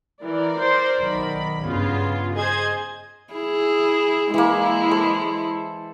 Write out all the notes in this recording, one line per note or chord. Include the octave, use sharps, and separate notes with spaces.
E3 A#4 D5
C5
B1 D#3 B5
G2 C#3 B3 F4
G#4 C5 D#5 G#6
E4 G#4
E3 G#3 A#3 E4
A4 C5